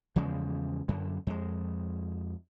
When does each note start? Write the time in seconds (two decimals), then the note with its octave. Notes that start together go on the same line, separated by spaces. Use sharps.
0.16 E2 C#3 F3 G#3
0.88 F#2 D3
1.27 F2 G#3